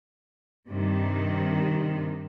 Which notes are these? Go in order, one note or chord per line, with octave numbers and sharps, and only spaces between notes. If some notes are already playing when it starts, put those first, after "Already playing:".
G2 C3 D#3